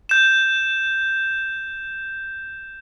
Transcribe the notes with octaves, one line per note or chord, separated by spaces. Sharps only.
G6 E7